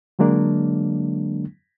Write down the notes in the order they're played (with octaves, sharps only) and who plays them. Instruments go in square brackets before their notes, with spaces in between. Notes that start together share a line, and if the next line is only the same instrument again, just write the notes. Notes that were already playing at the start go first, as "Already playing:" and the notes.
[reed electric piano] D3 F#3 G#3 A#3 D4